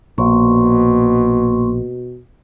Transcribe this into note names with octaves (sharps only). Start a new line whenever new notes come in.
A#1 B2 A#3 C6 C#6